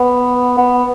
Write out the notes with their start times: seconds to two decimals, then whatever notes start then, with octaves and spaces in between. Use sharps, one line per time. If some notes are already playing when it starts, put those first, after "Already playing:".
Already playing: B3
0.58 B3